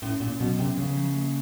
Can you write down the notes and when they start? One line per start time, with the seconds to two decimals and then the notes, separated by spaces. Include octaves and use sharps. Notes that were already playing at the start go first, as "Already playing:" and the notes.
0.02 A2 C#4
0.20 A#2 C#4
0.40 B2 F#3
0.59 C3 C#4
0.77 C#3 F3
0.97 F3
1.15 A#3